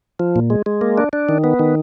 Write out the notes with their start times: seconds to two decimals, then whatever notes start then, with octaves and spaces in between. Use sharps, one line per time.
0.20 F3
0.36 A#2
0.50 G#3
0.66 G#3
0.81 A#3
0.98 D4
1.13 D4
1.29 D#3
1.44 B3
1.59 D#3